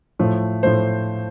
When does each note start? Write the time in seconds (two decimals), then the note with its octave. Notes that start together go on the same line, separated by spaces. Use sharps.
0.19 A2 F3 A3
0.63 A2 F3 A3 C5